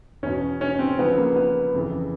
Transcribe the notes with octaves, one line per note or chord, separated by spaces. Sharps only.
E2 B2 C#4
C#4
C4
C#2 C#3 F3 B3
A#3
B3
F2 C#3 E3